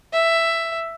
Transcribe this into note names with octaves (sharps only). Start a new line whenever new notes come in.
E5